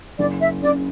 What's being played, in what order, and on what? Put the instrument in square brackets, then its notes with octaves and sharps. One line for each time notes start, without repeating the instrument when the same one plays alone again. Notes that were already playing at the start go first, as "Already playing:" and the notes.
[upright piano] F#1 [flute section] D5
[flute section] E5
[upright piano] C#3 [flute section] D5